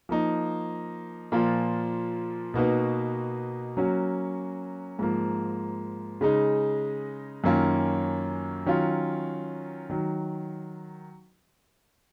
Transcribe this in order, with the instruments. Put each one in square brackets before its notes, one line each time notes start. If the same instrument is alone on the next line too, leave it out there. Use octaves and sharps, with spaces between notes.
[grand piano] F3 A#3 D#4
A#2 F3 A#3 F4
B2 A#3 D#4 F#4 B4
F#3 A#3 C#4 F#4
G#2 F3 A#3
C#3 G#3 D#4
F#2 D#3 A#3 C#4 F4
D#3 F#3 C#4 F4
D#3 F#3